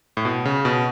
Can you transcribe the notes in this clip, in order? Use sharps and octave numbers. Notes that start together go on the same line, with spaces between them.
A2
B2
C#3
B2